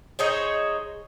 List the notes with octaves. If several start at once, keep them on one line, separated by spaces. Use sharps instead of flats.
D#4 G#4 C5 C#5